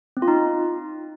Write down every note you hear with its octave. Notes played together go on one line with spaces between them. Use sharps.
C4
F4
D#4